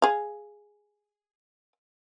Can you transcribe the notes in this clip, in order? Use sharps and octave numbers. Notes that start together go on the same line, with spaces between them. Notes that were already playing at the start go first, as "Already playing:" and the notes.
G#4 F5